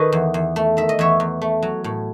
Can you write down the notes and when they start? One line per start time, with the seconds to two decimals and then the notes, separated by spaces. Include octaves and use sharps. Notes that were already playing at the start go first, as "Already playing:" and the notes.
Already playing: D#3 A4 B4 C#5 D#5
0.12 E2
0.34 E2
0.56 A3
0.77 D#3 E5
0.89 D#5
0.99 E2 C#5 E5
1.20 E2
1.42 A3
1.62 F#3
1.84 A2